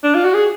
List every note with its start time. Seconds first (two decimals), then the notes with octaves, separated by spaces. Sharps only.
0.04 D4
0.15 F4
0.25 F#4
0.34 G#4